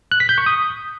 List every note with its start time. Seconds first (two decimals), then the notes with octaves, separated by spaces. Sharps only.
0.12 F#6
0.20 B6
0.29 G6
0.38 C#6
0.46 D#6